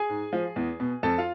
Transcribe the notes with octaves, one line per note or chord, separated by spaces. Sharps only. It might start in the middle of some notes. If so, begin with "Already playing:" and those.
Already playing: G#4 G#5
G#2
F3
E2
B2
F2 A4 A5
F4 F5